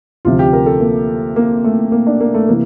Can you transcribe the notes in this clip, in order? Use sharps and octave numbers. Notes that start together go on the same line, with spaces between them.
D2 C3 F3 F4
G4
A#4
A4
A#3
A#3
A3
A#3
D4
A#3
A3
C3 E3 A#3